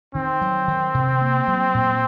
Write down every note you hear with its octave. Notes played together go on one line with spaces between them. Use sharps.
D#3 C4
F#3
D#3
C3
A#3
F#3
A#2